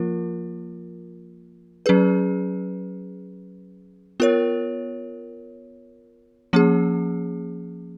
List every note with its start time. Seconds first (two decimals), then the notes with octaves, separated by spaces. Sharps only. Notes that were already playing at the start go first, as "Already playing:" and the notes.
Already playing: F3 A#3 F4 A#4
1.86 F#3 C#4 G#4 B4
4.20 B3 F4 A#4 C#5
6.53 F3 A#3 C#4 G#4